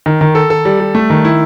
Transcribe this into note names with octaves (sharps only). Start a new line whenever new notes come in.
D#3
D#3
A4
A4
G3
G3
A3
D#3
E4